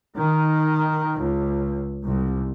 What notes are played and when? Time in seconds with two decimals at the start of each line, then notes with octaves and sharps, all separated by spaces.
0.15 D#3
1.21 C#2
2.03 C2